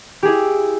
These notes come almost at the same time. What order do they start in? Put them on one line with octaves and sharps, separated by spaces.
G4 G#4 E4